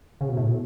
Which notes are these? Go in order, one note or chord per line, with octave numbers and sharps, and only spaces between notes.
C#3
B2
A2
B2